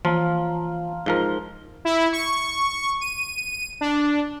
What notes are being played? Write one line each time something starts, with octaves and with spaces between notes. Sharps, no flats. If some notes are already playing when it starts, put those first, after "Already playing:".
E3 F3 F4 A5 A#5
G#2 F3 A#4 G7
E4
C#6
D#7
D4